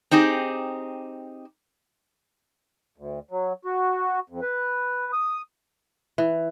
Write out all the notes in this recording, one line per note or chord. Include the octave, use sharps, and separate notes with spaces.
C4 D#4 G4 G#4
D2
F#3
F#4
F2
B4
D#6
E3